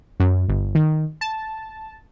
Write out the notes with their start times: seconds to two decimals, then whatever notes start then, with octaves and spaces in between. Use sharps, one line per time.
0.20 F#2
0.49 G1
0.75 D#3
1.21 A5